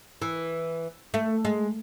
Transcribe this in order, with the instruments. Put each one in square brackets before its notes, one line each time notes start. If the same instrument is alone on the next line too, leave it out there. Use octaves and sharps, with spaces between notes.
[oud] E3
A3
G#3